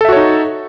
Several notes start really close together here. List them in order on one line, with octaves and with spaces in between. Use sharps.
A4 E5 F#4 C#5 D#4